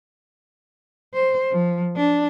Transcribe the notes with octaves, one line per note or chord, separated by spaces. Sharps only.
C5
F3
D4